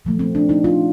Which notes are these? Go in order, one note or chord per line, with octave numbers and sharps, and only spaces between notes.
A#2 F3 A3
C4
D4
D#4
F4